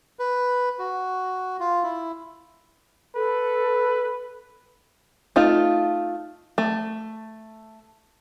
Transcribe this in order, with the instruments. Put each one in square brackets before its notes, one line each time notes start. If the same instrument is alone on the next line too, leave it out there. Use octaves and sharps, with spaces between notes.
[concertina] B4
F#4
F4
E4
[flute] A4 [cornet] B4
[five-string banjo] A3 D#4 F4
A3